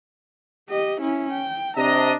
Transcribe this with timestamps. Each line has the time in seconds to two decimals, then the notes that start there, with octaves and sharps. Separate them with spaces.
0.69 G4 D#5
1.01 C#4 E4
1.33 G5
1.77 C3 D4 D#5 A#5